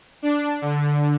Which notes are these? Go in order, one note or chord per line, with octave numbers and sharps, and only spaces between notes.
D4
D3